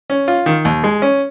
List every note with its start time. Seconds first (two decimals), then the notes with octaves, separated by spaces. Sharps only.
0.10 C#4
0.28 F4
0.46 D#3
0.65 D#2
0.84 G#3
1.02 C#4